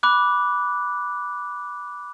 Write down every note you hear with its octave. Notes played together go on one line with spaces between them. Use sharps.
B5 D6 F#6